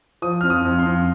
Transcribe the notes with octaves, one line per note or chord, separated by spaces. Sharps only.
F3 D#6
F2 F6
D#6
F2
C6
F2